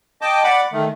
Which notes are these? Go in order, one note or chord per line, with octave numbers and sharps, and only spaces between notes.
D#5 G5 A5 D6
D5 F#5 B5 D6
D#3 A3